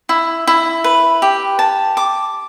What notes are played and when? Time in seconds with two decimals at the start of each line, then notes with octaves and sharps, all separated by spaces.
0.09 E4
0.47 E4
0.84 B4
1.22 G4
1.59 A5
1.97 D6